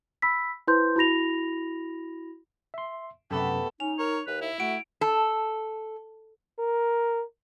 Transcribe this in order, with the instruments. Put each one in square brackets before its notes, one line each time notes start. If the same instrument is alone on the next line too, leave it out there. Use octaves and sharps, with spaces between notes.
[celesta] B5 E6 B6
E4 B4 C5 C6 G6
E4 F#4 B5 A#6 F7
[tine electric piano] E5 C6
[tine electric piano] F#2 C3 [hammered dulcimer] A3 B3 G4 [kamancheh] A4
[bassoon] C#4 [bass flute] D#4 [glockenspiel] F7
[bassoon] A#4 [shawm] C#5
[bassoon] D#2 [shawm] B4
[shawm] E4 [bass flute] E5
[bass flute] A3 [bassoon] F#4 [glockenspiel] D7
[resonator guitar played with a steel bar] A4
[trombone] A#4